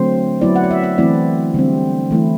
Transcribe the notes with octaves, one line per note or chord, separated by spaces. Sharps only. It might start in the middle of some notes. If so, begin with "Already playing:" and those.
Already playing: D3 F#3 A3 C4 C5
F#3 B3 E4 D5
F#5
D5
E5
E5
E3 A3 C4 E4 D5
D3 G3 C4
E3 A3 E4